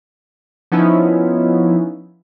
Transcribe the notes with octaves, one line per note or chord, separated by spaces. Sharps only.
F3 B3 C#4 D#4 E4